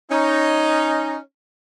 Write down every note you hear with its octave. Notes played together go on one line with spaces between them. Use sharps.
C#4 D#4